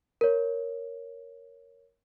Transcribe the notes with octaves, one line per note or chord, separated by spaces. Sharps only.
A#4 C#5